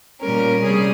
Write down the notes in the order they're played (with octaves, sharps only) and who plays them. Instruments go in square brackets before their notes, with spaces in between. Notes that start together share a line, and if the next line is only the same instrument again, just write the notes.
[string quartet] A#2 G3 C#4 A#4
C3 G3 C#4 G#4